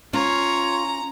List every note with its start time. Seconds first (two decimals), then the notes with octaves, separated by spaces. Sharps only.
0.13 C#4 F4 C#5 A#5